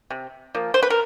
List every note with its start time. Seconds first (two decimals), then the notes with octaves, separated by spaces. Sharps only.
0.10 C3
0.55 F3 A#3
0.74 C5
0.83 B4
0.90 A#4